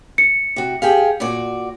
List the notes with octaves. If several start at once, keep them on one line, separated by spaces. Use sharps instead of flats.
C#7
C3 F#4
G4 G#4 F5
A#2 F#4 D5